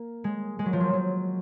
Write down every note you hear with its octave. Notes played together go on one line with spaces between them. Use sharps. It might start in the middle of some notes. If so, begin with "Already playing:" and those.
Already playing: A#3
G#3
G#3
F#3
F3
F#3
F#3